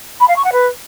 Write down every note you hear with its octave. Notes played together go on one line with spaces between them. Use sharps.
B5
F5
C#6
F#5
B4